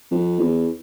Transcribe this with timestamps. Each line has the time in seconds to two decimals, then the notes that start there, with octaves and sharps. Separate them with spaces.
0.11 F2
0.40 E2